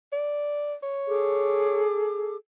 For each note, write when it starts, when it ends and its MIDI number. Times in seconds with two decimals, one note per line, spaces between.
0.13 0.74 74
0.83 1.83 73
1.08 2.36 68
1.08 2.36 69
1.08 2.36 86